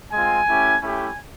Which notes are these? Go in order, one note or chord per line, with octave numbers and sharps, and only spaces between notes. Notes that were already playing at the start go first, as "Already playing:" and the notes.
G#3 C4 F4 G#5
A3 C#4 E4 G4
A3 C#4 E4 G4 G#5